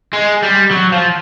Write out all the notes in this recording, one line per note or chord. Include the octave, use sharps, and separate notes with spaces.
G#3
G3
F#3
F3